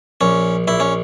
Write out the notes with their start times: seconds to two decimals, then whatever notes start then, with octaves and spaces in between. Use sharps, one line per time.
0.21 A#1 C#4
0.68 A#1 E4
0.80 C#4